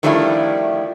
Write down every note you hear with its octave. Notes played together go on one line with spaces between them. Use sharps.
D#3 F3 G3 A3 D4 E4